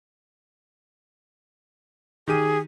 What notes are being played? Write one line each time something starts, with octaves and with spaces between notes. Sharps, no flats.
D#3 G4 G#4 D#7